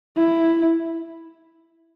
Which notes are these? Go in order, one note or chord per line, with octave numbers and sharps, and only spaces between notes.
E4